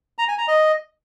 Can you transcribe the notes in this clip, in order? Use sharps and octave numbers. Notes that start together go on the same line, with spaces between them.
A#5
G#5
A#5
D#5